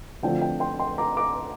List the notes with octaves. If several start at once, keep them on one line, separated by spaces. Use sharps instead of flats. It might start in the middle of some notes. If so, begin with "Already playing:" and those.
D2 D3 F3 C4 G5
G5
G5 C6
G5 C6
A#5 D6
A#5 D6